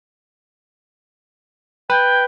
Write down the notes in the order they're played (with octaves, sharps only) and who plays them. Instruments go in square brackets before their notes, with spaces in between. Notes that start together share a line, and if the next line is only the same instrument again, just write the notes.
[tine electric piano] B4 [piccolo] G5